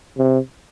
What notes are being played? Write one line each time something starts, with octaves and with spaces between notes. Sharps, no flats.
C3